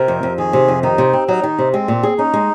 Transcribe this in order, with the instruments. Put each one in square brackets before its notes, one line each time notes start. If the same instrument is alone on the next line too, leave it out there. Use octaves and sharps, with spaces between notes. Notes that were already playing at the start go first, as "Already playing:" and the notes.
Already playing: [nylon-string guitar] C3 [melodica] A#4
[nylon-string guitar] F2
F2
[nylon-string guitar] D#3 [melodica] G#4
[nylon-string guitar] C3
F2
[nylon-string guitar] D#3 [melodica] D#4
[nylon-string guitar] C3
C4
[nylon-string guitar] F#3 [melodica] D#4
[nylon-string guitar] D#3
C3
[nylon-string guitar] G#3 [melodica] C4
[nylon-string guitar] A#2
G#4
[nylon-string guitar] C#4 [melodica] D#4
[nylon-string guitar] G#3